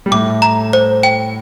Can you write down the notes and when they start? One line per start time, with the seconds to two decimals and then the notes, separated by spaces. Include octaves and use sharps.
0.06 G3
0.11 A2 A3 D6
0.42 A#5
0.73 C5
1.03 G5